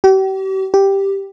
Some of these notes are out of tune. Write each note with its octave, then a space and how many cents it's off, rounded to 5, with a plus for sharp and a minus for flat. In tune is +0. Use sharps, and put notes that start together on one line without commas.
G4 -40
G4 +0